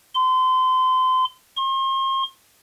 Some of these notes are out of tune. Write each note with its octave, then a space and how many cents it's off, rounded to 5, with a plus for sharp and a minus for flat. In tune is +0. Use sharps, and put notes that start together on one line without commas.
C6 -30
C6 +40